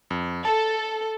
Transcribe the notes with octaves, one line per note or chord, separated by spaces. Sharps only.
F2
A4 A5